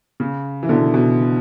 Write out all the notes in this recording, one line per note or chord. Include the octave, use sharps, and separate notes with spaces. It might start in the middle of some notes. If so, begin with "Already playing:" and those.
C#3
E3
B2 D3
B2